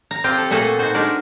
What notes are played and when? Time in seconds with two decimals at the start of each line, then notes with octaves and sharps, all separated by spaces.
0.11 A#5
0.24 C4 F4 G4
0.38 A4
0.50 A#2 A3 F#4 G#4 A4
0.79 D#4 F#4 C5
0.94 G#3 D4 D#4 A#4 D5